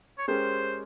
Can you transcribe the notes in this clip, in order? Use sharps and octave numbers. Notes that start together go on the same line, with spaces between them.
C#5
G#3 C#4 G4 A#4 C5